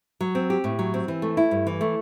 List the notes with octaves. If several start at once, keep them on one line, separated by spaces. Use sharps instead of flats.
F#3
C4
G4
A2
F#3
C4
E3
A3
E4
G2
E3
A3